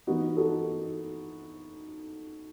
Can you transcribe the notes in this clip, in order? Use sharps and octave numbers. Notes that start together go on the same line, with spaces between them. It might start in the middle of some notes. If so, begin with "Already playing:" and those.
E3 B3 D#4 F#4
F#4 A4